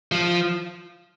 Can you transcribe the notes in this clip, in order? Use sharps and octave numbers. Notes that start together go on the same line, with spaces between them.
F3